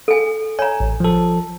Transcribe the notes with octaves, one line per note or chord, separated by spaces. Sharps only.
A4 G#5
C#5 G#5 A#5
A1
F3 A4